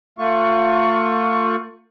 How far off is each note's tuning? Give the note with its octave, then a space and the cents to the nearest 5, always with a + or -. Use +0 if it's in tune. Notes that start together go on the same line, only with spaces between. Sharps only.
A3 +40 F4 +25 C#6 +10